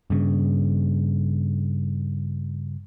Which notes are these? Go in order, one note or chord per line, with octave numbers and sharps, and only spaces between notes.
G2 C#3